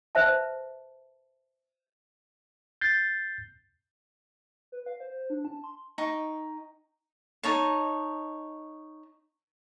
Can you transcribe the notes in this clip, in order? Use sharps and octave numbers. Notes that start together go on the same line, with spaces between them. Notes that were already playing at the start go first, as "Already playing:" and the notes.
B4 C5 E5 A5
G6 A6 C7
B4
F5
C5
D4
A5
C6
D#4 G5 C#6
D#4 C#5 A5